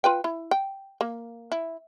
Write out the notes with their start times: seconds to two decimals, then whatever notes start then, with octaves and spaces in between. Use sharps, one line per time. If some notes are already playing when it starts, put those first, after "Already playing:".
0.04 F4 B4 G5
0.24 E4
0.51 G5
1.01 A#3
1.52 E4